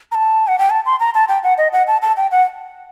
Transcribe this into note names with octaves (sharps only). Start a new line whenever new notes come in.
A#5
A5
F#5
G5
A5
C6
A#5
A5
G5
F#5
D#5
F#5
A5
A5
G5
F#5